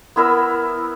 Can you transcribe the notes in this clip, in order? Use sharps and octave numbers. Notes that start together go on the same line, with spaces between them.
B3 E4 A#4 E6